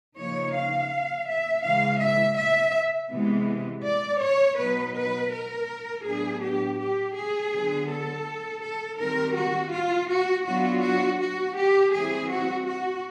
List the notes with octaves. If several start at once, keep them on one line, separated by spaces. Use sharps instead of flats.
C#3 F3 A#3 D#4 C#5
F5
E5
C#3 E3 G#3 F5
E5
E5
C3 E3 G#3 B3
D5
C#5
B2 F#3 B3 D#4 B4
B4
A#4
A2 F#3 B3 D4 G#4
G4
G4
G#4
D3 F#3 B3
A4
A4
D#3 G3 C4 A#4
F#4
F4
F#4
F#3 B3 D4 F4 F#4
F#4
F#4
G4
E3 G3 C4 E4 G#4
F#4
F#4